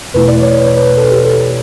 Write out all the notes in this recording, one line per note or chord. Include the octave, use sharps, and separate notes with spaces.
E2 B2 A3 E4 B4
D5
C#5
B4
C#5
B4
A4
G4
A4